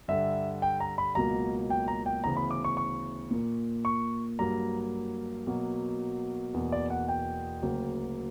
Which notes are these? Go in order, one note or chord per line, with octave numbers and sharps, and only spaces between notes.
G2 D3 G3 E5
G5
A#5
B5
C#2 B2 F#3 A#3 A#5
G5
A#5
G5
D2 C#3 E3 B3 A#5
B5
D6
C#6
C#6
A#2 A#3
C#6
G2 F#3 A#3 A#5
B2 F#3 A#3
E2 B2 A#3
D5
F#5
G5
D2 C#3 F#3 A#3